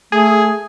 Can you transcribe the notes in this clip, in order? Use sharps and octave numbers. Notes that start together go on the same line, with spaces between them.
A3 G#4